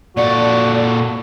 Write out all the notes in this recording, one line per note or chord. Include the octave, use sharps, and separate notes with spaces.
A#2 F#4 A4 D5